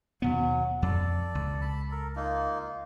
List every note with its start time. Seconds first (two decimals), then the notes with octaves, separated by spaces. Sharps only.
0.22 D#2 B2 F#3 B3
0.82 F2 A4 D5
1.35 C#2
1.61 A5 B5
1.91 A4 A#4
2.16 A#3 D#4 F4